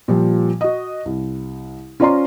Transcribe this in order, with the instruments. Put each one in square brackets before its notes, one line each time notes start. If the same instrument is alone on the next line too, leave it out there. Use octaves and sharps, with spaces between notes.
[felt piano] A#2 F3 G3
F#4 D#5
C2
C#4 F4 C5 D5 A#5 C6